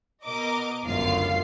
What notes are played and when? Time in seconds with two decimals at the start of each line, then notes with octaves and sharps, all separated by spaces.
0.24 B2 A#4 D#5 D6
0.85 G1 C#2 F#2 F4 F5 C7